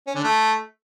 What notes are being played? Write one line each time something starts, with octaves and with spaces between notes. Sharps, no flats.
C#4
D3
A3